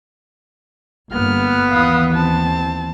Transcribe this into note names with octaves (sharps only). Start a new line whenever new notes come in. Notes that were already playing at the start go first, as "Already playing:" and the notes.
G1 A#3 B3 F6
D#2 E3 F5 D#6
C4 A5